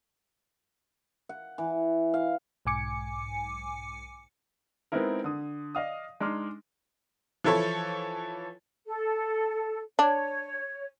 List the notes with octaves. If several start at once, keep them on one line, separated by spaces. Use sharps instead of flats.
F#5
E3
F5
B1 G#2 G#5 D6 C#7
G#3 B3 C4 D#4 E4 A#4
D3 D#6
D5 D#5 F5 D#6
G#3 D4 D#4 C6 D6 F6
E3 F3 E4 A4 C#5
A4
D4 C#5